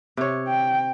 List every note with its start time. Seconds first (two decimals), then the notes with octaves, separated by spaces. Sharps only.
0.17 C3 C#5
0.48 G5